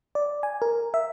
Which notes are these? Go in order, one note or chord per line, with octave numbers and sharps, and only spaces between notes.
D5
G#5
A#4
E5